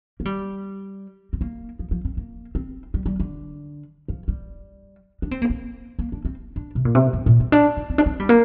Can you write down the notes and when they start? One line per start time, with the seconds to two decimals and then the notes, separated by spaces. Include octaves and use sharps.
0.20 A#3
0.25 G3
1.33 C4
1.41 A#3
1.79 F3
1.91 F3
2.05 C4
2.17 A#3
2.55 C4
2.94 G3
3.06 G3
3.20 D3
4.08 F3
4.28 G3
5.22 D4
5.31 C4
5.42 A#3
5.50 C4
5.99 A#3
6.12 D4
6.25 C4
6.56 D4
6.75 C3
6.85 A#2
6.95 C3
7.13 G2
7.26 A#2
7.40 C4
7.52 D4
7.77 D4
7.90 C4
7.98 D4
8.06 C4
8.20 G3
8.29 A#3